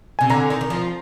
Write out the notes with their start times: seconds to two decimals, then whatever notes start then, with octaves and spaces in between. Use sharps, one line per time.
0.19 C3 G#5
0.30 D3 A#5
0.50 D#3
0.61 D#3
0.70 F3